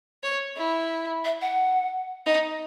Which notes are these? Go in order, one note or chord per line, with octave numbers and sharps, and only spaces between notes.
C#5
E4
E5
F#5
D#4